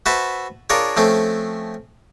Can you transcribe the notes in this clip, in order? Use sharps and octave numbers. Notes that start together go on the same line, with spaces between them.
F#4 B4 C5 E5 A5
D4 F4 G#4 A#4 C#5
F3 A3 C4 C#4